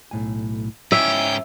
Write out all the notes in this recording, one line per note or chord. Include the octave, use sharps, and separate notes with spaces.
B1 A2 G#5
G#2 C#4 E4 D#5 E5 G5